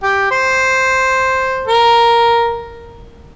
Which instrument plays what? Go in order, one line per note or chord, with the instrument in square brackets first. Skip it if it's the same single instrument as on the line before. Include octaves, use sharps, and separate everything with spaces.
[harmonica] G4
C5
A#4